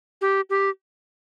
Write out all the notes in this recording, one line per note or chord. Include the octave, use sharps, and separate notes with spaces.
G4
G4